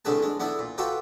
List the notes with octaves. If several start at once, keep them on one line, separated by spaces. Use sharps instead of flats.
C2 A2 D3 G#4 B4 A5
G#3 D4
B3 D4 E4 A4
A#2
F4 F#4 A4 B4 D5 G5